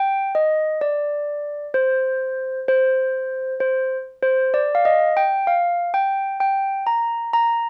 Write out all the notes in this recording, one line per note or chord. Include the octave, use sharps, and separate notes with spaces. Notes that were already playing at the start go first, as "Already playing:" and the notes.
Already playing: G5
D#5
D5
C5
C5
C5
C5
D5
F5
D#5
G5
F5
G5
G5
A#5
A#5